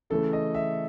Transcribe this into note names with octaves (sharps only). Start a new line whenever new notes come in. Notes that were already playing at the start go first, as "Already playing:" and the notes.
C#3 E3 A3 A4
D#5
E5